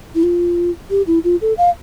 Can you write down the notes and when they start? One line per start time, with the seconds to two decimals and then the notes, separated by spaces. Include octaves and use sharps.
0.15 E4
0.23 F4
0.90 G4
1.07 E4
1.24 F4
1.41 A4
1.58 F5